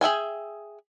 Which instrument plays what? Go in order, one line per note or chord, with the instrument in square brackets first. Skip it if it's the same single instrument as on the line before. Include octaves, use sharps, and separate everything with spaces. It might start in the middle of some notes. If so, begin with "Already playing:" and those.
[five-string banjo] G#4 E5 G5 G#5